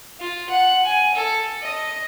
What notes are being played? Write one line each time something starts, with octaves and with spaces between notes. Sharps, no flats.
F4
F#5
G#5
A4
D#5